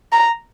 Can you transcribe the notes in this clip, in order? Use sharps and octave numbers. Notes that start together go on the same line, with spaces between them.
A#5